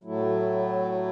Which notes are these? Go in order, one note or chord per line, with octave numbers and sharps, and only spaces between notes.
A2 F#3 A3 E4